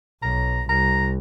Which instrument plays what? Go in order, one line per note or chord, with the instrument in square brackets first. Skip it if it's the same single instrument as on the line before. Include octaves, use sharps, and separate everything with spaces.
[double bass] B1 [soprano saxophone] A#5
[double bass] C2 [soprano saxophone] A#5